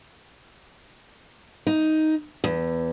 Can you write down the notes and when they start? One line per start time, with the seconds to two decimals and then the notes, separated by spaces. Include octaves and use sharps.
1.67 D#4
2.44 E2